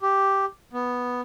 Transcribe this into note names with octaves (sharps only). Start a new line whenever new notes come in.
G4
B3